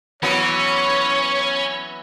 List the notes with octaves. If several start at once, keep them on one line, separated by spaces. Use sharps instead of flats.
E3 F#3 B3 C#4 C#5